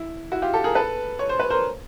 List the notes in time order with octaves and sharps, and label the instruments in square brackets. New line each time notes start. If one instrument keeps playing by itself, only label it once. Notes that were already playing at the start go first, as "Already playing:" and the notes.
Already playing: [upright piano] E4
E4 F#4
F4 G4
G4 A4
G#4 A#4
A4 B4
C#5
C5
B4
A#4 C5